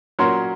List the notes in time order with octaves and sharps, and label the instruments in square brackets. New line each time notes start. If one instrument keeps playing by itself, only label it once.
[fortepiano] A#2 F#3 C#4 F#4 A#4 [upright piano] C6